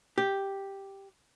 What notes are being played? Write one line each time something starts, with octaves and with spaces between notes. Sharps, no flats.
G4